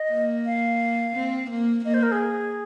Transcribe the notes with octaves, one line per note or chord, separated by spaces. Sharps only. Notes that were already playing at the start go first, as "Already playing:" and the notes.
Already playing: D#5
A#3
F5
C4
A#3
A#3 D#5
C5
A#4
G#4